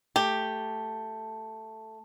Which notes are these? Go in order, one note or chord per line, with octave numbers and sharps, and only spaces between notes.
A3 G4